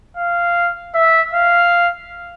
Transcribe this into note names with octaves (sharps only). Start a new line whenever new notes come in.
F5
E5
F5